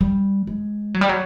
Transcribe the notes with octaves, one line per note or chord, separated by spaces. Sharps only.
G3
G#3
F#3
G3
F#3